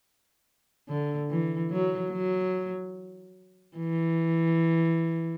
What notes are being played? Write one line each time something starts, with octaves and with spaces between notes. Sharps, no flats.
D3
E3
F#3
F#3
E3